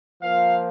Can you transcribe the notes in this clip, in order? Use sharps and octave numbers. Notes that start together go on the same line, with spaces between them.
F3 A#3 F4 F5